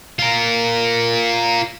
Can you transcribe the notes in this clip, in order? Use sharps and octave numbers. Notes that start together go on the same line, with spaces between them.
F4 A#4